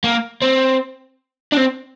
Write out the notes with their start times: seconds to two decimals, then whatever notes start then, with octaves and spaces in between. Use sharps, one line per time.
0.04 A#3
0.42 C4
1.52 D4
1.57 C4